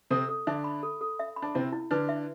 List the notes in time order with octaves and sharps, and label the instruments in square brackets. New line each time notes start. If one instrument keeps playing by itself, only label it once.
[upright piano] C3 C4 [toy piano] A4
[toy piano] A4
[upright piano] D3 D4 [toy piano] E5
[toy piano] B5
A4
A4
E5
B5
[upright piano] D4
[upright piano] C3 C4 [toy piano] E4
[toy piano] E4
[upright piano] D3 D4 [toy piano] B4
[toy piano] E5